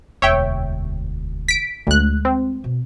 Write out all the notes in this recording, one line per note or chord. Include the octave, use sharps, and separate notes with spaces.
E1 D2 C#5 E5 G5
B6 D7
D2 G#3 A3 F#6
C4
B2